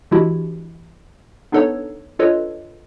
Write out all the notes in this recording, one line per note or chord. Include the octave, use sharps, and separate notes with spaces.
E3 G#3 D4 E4 F#4 G4
B3 D4 D#4 A4 B4 C#5
D4 F4 A4 B4 C#5 D#5